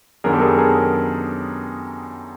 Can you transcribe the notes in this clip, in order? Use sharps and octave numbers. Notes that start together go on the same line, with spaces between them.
F#2 D#3 F#3 B3 D4 G#4 A#4
G4 A4
G#4 A#4
G#4 A#4